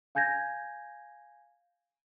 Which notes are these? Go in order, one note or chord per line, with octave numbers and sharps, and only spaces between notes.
F5 G#5 G6 G#6 A#6